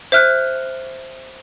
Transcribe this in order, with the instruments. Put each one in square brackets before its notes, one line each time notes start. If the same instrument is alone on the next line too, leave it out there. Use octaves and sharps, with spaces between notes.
[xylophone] C5 E5 F6 F#6